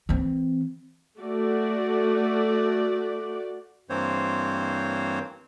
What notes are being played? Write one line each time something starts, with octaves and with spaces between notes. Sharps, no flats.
E3 C4
A3 F#4 D5
G2 E3 A#3 C4 C5 C#5